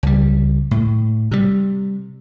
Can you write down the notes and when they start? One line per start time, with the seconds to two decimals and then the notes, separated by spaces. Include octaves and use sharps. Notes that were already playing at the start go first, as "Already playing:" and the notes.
0.03 C#2 G3
0.71 A2
1.31 C3 G3